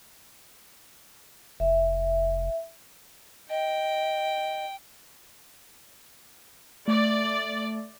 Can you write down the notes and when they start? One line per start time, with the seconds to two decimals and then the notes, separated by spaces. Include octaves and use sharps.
1.60 F1 E5
3.50 D#5 G5
6.88 A3 D5